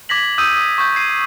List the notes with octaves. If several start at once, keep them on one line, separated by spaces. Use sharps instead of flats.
D6 G#6 A#6 B6 F#7
D#6 E6 G6 D#7
D#6
C#6 G6
G#6 C7 D#7